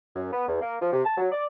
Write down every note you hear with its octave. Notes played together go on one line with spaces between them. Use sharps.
F#2
B3
E2
A#3
F3
C3
A5
F#3
D5